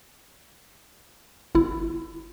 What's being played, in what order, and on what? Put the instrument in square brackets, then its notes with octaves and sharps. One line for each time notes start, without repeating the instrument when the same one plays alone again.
[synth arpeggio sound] G1 E4